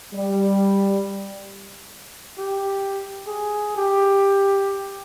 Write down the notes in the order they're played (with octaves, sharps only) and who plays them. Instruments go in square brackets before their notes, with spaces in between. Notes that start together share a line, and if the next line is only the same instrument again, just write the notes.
[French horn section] G3
[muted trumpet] G4
G#4
G4